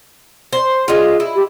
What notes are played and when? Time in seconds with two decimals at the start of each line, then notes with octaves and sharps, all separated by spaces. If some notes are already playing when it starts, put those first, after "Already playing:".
0.53 C5
0.88 G#3 F4 G#4
1.20 E4
1.35 G4